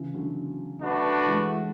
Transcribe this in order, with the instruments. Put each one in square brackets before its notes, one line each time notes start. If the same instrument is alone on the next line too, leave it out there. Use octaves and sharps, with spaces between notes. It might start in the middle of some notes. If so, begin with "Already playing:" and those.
Already playing: [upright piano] C#3 E3
D3 F#3
[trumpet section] A3 D4 F#4 B4
[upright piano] E3 G#3